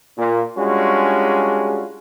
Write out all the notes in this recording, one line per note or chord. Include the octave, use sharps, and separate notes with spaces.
A#2
G3 G#3 C#4 D4 F4 F#4